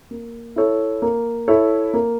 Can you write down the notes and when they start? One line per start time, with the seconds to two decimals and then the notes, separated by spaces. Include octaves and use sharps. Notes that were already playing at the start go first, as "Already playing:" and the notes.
0.11 A#3
0.56 E4 A4 C#5
1.02 A#3
1.48 E4 A4 C#5
1.94 A#3